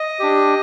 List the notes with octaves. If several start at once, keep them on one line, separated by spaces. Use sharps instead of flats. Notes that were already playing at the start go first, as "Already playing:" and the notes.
Already playing: D#5
D4 G4